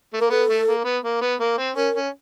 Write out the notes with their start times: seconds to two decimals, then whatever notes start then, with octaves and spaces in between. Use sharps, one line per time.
0.13 A3
0.19 A#3 A#4
0.30 B3 A4
0.49 A3
0.67 A#3
0.84 B3
1.04 A#3
1.21 B3
1.40 A#3
1.58 C4
1.76 C#4 A#4
1.95 C#4